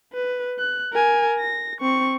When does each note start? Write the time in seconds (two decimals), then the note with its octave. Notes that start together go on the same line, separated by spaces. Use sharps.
0.13 B4
0.59 F#6
0.93 A#4 G#5
1.39 A#6
1.81 C4 C#6